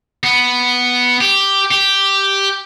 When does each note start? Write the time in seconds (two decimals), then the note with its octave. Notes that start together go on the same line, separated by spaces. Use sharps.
0.24 B3
1.21 G4
1.71 G4